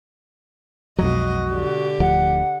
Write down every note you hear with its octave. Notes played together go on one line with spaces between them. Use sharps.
B1 F2 B2 F#3 G#3 F#4 D#5
D3 G4
D1 D2 F3 F#5